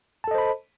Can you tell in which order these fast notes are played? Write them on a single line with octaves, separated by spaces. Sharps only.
A5 A4 D#5 C5 B5